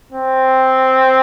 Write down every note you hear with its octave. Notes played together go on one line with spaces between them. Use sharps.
C4